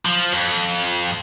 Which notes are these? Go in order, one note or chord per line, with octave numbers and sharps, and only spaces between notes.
F3
F2